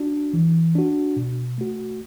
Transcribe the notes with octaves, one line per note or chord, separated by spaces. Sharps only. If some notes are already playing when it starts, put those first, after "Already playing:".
Already playing: D4 F#4
E3
D4 F#4
B2
A3 F#4